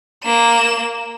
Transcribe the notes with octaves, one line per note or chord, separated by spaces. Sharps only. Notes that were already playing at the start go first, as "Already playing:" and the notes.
A#3 E7